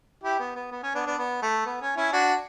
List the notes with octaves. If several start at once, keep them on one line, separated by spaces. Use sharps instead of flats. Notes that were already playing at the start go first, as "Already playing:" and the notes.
E4 G4
B3
B3
B3
C#4
B3 D4
B3 D4
B3
A3
B3
C#4
C#4 E4
D4 F#4